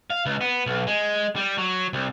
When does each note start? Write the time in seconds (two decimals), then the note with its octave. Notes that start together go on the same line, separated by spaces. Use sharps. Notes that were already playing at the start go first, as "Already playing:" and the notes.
0.10 F5
0.26 C#2
0.41 B3
0.66 B1
0.87 G#3
1.36 G3
1.58 F#3
1.93 C2